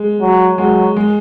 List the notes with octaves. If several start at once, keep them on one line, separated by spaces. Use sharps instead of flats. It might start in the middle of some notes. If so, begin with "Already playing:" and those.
Already playing: G#3
F#3
F#3 G#3
G#3